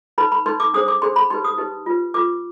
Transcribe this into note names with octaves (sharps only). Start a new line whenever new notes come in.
D#4 B4 B5
B5
D#4 B4 C6
D6
D4 G#4 C5 D#6
D6
D4 G#4 C5 C6
B5
D#4 G4 B4 C6
D#6
D#4 G4 B4
F4 B4
F4 B4 D6